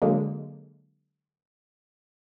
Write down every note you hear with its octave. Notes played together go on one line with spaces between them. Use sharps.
D3 F#3 G#3 A#3